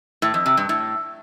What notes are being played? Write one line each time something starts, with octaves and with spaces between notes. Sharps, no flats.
A2
F2
C3
G2
A2